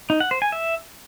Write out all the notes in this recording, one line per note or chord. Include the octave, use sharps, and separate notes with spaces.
D#4
F#5
C5
G#5
E5